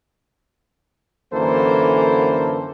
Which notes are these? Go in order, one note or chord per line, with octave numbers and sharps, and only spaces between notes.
F#2 D3 E3 A#3 A4 C5